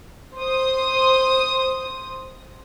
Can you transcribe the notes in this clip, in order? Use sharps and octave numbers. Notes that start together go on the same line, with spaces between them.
C5 D#6